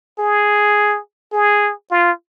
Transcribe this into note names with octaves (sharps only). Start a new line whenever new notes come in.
G#4
G#4
F4